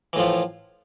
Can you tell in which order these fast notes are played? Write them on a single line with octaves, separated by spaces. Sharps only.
E3 A2 F3